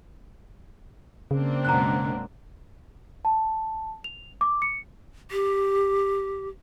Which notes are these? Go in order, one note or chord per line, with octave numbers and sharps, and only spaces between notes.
C#3 A#3 C4 D4
F#2 B2 G#3 A#5 F#6
A5
F7
D6
C#7
G4